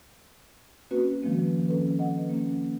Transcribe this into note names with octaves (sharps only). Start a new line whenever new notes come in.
A#3 C4 C#4 F#4 B4
D#3 F3 G#3 A#3 C4
C#4 A4 B4
D#5 F#5
A#3 C#4